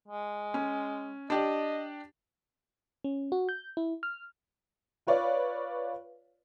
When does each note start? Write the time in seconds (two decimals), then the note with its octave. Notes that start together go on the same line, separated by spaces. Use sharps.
0.08 G#3
0.54 C#4
1.30 D4 G4 D5 D#5
3.04 C#4
3.32 F#4
3.49 G6
3.77 E4
4.03 F6
5.07 F4 B4 C#5 D5 F5